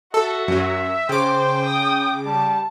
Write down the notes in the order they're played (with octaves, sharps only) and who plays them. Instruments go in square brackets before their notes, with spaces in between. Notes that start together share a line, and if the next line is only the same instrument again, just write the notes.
[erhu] F#4 [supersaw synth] A4 [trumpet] E5
[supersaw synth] F#2 F#3
[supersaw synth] C#3 D6 [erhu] C5 [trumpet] G5
[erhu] D#6
[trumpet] G3 [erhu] A5